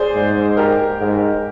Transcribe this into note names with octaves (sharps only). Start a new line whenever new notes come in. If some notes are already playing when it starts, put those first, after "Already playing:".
Already playing: G#4 C5 D5
G#2
G4 A#4
G#2